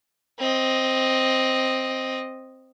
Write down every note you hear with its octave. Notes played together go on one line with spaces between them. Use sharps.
C4 D#5